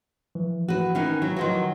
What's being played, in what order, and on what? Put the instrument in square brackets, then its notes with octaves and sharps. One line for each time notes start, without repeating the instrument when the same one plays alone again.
[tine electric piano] E3 F3
[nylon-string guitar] F#4 B4
[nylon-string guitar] D#3 E3 B3 [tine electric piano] C#4
[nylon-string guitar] F#3
[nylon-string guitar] D#3 F3 F#3 [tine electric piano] B4 F#5 C6